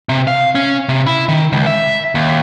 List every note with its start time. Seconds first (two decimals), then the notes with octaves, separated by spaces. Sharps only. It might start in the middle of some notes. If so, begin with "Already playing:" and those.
0.09 C3
0.27 F5
0.55 C#4
0.89 C3
1.07 E4
1.29 D#3
1.53 C#2
1.67 E5
2.15 D#2